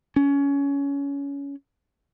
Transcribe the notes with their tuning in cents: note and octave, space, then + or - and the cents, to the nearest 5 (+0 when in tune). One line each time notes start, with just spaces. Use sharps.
C#4 +20